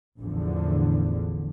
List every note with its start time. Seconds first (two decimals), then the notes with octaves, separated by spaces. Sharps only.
0.19 A1 E2 D3 F3